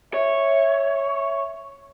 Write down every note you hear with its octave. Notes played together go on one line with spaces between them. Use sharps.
C#5 E5